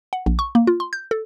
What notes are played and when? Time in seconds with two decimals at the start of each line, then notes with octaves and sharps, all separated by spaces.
0.13 F#5
0.26 A#1
0.39 C#6
0.55 A#3
0.67 F4
0.80 C6
0.93 G6
1.11 A4